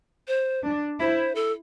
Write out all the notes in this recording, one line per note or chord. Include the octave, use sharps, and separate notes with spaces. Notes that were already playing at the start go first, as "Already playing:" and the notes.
C5
D4
E4 C5
A4